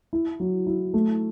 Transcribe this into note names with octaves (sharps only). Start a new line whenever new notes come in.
E4
F#3
E4
A3